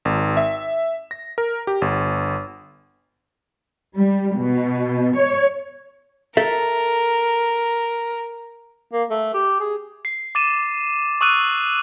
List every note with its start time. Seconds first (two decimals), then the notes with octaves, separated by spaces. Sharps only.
0.05 G#1
0.37 E5
1.11 A#6
1.38 A#4
1.67 G4
1.82 G1
3.94 G3
4.36 B2
5.16 C#5
6.37 A4 A#4 E5
8.93 A#3
9.10 A3
9.34 G4
9.60 G#4
10.05 C7
10.35 D6 A6 D#7 E7
11.21 C#6 D#6 E6 F#6 D#7